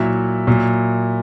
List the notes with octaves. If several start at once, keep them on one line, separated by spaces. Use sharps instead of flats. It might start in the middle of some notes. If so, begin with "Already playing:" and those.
Already playing: A#2 F#3 E4 E5
A#2 F#3